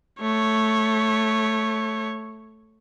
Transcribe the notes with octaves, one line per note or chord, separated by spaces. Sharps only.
A3 C#5